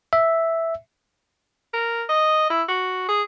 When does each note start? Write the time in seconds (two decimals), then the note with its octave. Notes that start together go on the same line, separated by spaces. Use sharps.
0.13 E5
1.74 A#4
2.09 D#5
2.50 E4
2.69 F#4
3.08 G#4